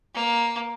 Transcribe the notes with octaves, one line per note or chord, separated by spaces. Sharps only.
A#3